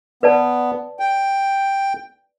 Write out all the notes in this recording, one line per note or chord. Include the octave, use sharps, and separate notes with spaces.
B3 B4 D5 A5
G5